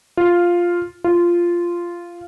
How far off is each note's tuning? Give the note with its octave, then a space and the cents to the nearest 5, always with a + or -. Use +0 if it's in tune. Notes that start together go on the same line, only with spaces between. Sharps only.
F4 +0
F4 -10